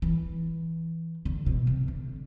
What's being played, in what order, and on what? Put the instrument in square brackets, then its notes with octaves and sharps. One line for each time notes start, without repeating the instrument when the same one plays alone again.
[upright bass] E3
D3
B2
C3
D3